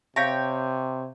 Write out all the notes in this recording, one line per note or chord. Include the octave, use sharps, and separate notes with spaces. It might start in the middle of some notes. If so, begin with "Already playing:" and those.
C3 C#5 E5 F5 G5